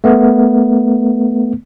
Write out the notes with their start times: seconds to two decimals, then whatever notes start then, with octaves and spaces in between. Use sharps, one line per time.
0.04 A3 B3